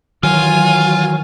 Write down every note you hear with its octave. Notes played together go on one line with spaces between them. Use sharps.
D#3 E3 F#3 F4 G#5